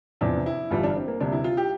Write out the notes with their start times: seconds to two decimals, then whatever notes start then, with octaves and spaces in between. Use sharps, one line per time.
0.21 E2 C3 F3 D4
0.46 E4
0.70 G1 G2 E3 G3 F4
0.83 D4
0.96 C4
1.08 A#3
1.20 D2 C3 G3 D4
1.32 E4
1.44 F4
1.57 G4